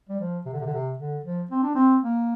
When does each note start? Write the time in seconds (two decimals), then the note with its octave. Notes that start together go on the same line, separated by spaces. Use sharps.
0.09 G3
0.20 F3
0.46 C3
0.53 D3
0.60 C3
0.67 D3
0.74 C3
0.98 D3
1.24 F3
1.51 C4
1.63 D4
1.75 C4
2.03 A#3